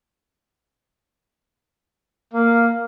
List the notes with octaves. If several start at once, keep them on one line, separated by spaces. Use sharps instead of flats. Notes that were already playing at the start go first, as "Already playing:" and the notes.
A#3